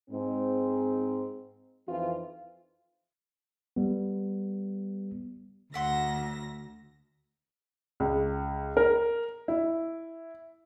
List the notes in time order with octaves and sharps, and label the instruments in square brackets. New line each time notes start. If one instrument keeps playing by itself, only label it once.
[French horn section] G#2 C4
F2 E3 F3 C4 D#4 F4
[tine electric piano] G3 B3
[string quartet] D2 A#6 [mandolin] E5 F#5 C6
[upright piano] C#2
A#4
E4